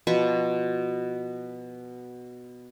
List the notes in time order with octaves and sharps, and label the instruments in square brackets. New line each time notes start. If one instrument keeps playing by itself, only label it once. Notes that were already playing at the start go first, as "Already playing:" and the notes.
[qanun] B2 F3 B4 C#6